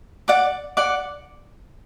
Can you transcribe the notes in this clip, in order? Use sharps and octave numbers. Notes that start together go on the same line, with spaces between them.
D5 F#5 D6
D5 F#5 D6